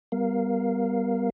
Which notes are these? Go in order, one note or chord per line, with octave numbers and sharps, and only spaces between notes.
G3 B3 A#4 F5